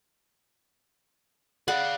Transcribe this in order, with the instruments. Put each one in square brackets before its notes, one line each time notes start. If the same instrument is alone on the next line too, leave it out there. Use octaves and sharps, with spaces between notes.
[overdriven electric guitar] G#4 F5 [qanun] D5 F#5